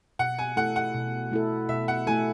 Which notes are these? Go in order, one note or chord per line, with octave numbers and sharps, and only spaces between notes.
B2 F#5
G#5
A3 E4 A4 F#5
F#5
B2
A3 E4 A4
B2 E5
F#5
A3 E4 A4 G#5